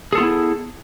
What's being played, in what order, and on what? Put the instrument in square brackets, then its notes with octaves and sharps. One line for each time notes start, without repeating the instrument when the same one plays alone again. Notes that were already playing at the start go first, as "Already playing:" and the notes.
[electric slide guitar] G#4
A4
F4
B3
E4